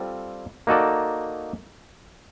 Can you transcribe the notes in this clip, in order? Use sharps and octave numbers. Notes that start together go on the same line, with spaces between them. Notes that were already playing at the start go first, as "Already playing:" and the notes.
Already playing: G3 C4 F4 A4
A#3 D#4 F#4 A4 D5